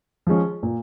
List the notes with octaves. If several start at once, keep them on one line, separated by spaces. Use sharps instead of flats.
F3 G#3 C#4
A#2